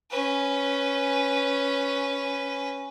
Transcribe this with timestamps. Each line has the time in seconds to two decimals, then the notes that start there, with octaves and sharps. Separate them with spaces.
0.10 C#4 B4